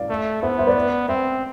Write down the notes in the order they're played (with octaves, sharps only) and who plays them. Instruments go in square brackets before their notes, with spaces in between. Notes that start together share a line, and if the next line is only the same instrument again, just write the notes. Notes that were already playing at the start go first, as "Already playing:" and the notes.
Already playing: [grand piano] D5 F5
[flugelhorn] A3
[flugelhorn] B3 [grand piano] C5 E5
[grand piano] C5 E5
B4 D5
[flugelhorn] C4 [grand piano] C5 E5